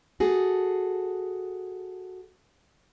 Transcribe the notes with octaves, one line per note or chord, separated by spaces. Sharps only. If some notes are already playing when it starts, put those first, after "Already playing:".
F#4 G#4 A4